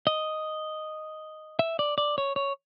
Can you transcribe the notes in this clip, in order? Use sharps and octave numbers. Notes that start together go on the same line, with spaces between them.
D#5
E5
D5
D5
C#5
C#5